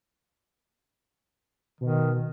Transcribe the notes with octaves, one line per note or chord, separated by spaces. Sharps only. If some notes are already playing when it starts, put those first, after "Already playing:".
B2 D#3